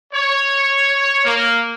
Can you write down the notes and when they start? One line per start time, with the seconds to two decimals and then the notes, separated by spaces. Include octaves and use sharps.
0.14 C#5
1.25 A#3